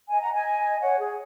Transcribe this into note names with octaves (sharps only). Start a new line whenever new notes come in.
D#5 G#5
F#5 A#5
D#5 G#5
C#5 F#5
G#4